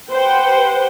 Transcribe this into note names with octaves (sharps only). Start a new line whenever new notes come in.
G4 B4 C5 F#5 G5